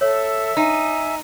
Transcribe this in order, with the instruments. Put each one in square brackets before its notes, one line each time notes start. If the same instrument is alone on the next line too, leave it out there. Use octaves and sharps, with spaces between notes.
[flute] A4 [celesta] C#5 [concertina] E5
[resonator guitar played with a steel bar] D#4 [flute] G#5